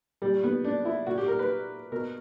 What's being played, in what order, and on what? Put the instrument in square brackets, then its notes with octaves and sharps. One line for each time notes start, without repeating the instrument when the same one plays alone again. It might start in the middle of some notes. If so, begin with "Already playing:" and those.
[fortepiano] A#2 G3
B3
D4
E4
A#2 F#4
G4
A#4
B4
B2 A#4